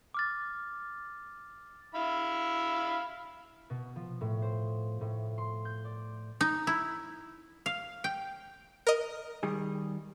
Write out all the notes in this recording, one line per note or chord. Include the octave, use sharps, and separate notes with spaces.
D6 F6 A6
E4 F5 B5
B2
F3
A2
C5
A2
C6
G6
D5
D#4
E4
F5
G5
A#4 D#5
D#3 G3 G#4